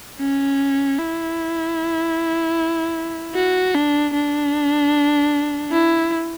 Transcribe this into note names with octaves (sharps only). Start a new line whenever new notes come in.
C#4
E4
F#4
D4
D4
E4